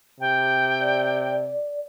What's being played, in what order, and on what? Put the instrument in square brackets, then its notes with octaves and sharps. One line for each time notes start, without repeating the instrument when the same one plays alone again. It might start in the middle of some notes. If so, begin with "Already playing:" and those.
[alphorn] C3 [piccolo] G5
[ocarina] D5